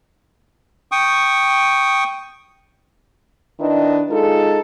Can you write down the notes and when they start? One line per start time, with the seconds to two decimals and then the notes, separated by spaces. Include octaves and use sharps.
0.92 G5 C#6 D#6
3.60 D#3 D4 E4 B4 D#5
4.10 G#3 D#4 F4 G#4 A4